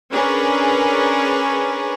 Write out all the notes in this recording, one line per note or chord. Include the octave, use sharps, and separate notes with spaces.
C#4 D4 G#4 A#4 B4